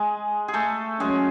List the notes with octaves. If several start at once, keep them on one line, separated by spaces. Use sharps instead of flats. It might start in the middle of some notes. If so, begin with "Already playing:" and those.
Already playing: G#3 G#4
G#4
A3 A4
F#3 G#3 C#4 G#4